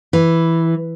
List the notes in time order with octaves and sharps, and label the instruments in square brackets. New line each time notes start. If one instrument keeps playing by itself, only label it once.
[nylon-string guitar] E3